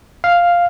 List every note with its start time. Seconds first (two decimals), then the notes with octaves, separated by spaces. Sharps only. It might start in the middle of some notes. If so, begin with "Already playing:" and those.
0.24 F5